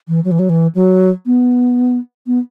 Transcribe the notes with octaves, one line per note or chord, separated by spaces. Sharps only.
E3
F#3
E3
F#3
E3
F#3
B3
B3